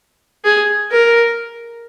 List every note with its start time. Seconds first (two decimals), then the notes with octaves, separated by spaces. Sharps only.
0.45 G#4
0.91 A#4